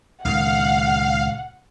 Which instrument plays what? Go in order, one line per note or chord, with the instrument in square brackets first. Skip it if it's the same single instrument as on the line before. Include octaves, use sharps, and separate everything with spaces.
[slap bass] C#2 A#2 D#3 [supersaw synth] F5 [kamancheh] F#5